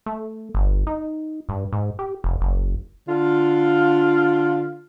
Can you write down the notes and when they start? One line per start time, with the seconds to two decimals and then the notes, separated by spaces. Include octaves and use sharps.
0.06 A3
0.55 G1
0.87 D#4
1.49 G2
1.72 G#2
1.99 G4
2.24 F1
2.41 F#1
3.08 D3 F4